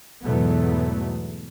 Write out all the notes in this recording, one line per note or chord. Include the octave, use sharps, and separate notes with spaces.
E2 G#2 B2 F#3 A3 B3